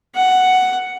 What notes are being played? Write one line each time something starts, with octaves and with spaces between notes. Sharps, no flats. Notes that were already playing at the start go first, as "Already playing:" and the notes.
F#5